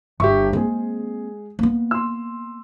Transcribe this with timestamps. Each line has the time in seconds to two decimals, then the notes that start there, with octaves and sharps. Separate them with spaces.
0.20 G1 G4 E5 C#6
0.53 G#3 A#3 C4 G#4
1.59 A#3 B3
1.91 C6 E6